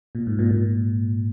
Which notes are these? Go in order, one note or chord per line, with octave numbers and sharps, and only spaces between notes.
A#2
G#2
A#2
A#2